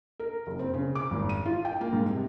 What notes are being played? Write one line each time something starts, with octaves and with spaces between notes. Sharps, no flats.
A#4
F#1
C4
C#3
D6
G#1
D#7
F4
G5
A#3
G#2
C3